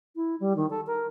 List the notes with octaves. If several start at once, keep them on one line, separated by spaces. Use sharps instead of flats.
E4
G3
D#3
A4
A#4